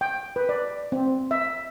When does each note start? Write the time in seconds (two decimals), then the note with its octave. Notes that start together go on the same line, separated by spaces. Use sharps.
0.01 G5
0.36 B4
0.49 D5
0.92 C4
1.31 E5